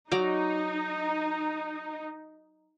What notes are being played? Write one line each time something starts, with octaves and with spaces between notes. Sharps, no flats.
F#3 D#4 D5 A#5